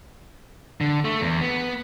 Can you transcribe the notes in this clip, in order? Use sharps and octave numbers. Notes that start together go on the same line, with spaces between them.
D3
A3
E2
B3